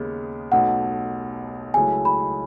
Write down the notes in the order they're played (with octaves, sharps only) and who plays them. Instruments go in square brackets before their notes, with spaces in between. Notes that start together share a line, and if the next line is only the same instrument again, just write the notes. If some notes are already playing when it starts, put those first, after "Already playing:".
Already playing: [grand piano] D#2 C#3 G#3 B3
[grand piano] B1 B2 A3 [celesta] F#5
[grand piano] C#2 C#3 F#3 A3 E4 [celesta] G#5
[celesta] B5